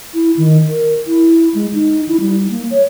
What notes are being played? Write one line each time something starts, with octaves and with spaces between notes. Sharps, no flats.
E4
D#3
A#4
E4
G#3
D#4
E4
G3
A#3
C#5